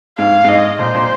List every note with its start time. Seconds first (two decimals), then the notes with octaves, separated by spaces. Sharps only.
0.18 G#2 F5
0.44 G#2 D#5
0.79 A#2 C5
0.95 A#2